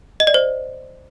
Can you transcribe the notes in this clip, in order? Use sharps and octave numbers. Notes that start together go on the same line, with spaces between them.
D#5
D5
C5